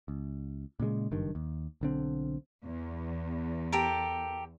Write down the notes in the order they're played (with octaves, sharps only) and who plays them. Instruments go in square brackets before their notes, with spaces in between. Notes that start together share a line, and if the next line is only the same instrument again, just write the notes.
[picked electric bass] C#2
A#2 C#3 G3 G#3
F#1 G2 D#3
D#2
B1 D3 C4
[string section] E2
[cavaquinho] G4 A4 A#4